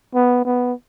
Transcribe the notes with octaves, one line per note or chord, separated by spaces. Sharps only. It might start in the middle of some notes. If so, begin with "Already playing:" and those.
B3
B3